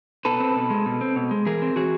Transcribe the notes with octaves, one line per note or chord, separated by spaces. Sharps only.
B2 A4 B4
C4
B2
G#3
B2
C4
B2
G#3
E3 G#4 A#4
C4
E3 F#4 G#4